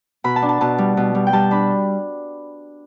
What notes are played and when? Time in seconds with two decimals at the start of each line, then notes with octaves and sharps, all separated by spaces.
0.24 B2 B5
0.36 A5
0.42 D4
0.49 A5
0.61 B2 A5
0.78 G3
0.97 B2
1.15 G3
1.27 G5
1.33 G3 A5
1.51 D4 B5